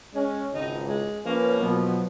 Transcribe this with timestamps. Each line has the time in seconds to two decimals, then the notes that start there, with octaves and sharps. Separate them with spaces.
0.14 G#3 C#4
0.54 G#1 C#2 D#4
0.89 G#3
1.26 F3 A#3 C#4 B4
1.60 B2 F3 F#3 B3